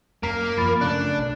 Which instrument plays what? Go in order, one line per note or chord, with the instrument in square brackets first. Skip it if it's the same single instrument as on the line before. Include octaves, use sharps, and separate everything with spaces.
[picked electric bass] F#2 [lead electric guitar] A#3 [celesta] A#5 B6 C7
[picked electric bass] F#2 F3 [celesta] B5 A6
[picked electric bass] C#3 A3 [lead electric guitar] D4 [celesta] F#6 D7
[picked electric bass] B1